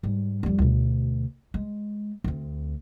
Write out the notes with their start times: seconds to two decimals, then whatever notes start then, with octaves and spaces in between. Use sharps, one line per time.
0.03 G#2 G3
0.43 F2 G3
0.59 D2 B2
1.54 G#3
2.24 D2 C4